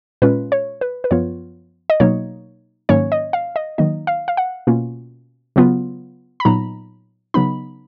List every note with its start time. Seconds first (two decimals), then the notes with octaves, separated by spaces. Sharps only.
0.22 A#2 G#3 C#4 F4 B4
0.52 C#5
0.81 B4
1.04 B4
1.11 F#2 F3 B3 F4 C#5
1.90 D#5
2.00 B2 F#3 A#3 D#4 C#5
2.89 G#2 D#3 F#3 A#3 C#4 C#5
3.12 D#5
3.33 F5
3.56 D#5
3.78 D#3 F#3 A#3 D#4 D#5
4.07 F5
4.28 F5
4.37 F#5
4.67 B2 A#3 C#4 F4
5.56 C#3 F#3 B3 F4
6.40 B5
6.45 A#2 F#3 B3 D#4 A#5
7.34 C#3 F#3 B3 D#4 B5